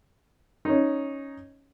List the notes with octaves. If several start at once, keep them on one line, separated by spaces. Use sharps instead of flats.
C#4 D#4